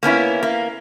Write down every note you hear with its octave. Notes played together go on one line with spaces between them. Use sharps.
A#3 B3 C#4 E4
A#3